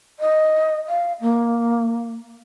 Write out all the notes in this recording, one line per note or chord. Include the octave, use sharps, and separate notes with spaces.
D#5
F5
A#3